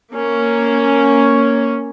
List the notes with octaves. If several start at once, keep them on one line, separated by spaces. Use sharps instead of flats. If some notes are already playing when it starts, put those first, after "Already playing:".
A#3 C#4